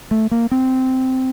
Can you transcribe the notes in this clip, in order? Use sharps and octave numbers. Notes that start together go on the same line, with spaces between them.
A3
A#3
C4